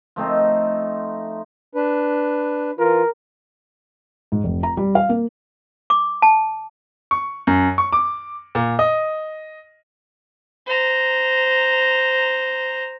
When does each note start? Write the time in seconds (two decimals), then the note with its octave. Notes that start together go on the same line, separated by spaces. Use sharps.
0.16 F3 A3 C4 D#4
1.75 D4 B4
2.79 E3 F4 A#4
4.32 G#2
4.44 F1
4.63 A#5
4.77 G3
4.95 F5
5.09 A#3
5.90 D6
6.22 A5
7.11 C#6
7.47 F#2
7.78 C#6
7.92 D6
8.55 A#2
8.79 D#5
10.66 C5 A#5